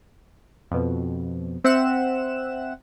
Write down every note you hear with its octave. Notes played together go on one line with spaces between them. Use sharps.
F2 B2
C4 E5 F#5 F#6 E7